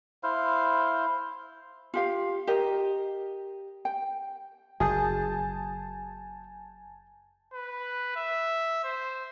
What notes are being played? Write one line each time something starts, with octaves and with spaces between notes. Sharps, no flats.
E4 C5 F5
F4 G4 F5
G4 A#4 D#5
G5
F#1 G#4 G#5 A5 G6
B4
E5
C5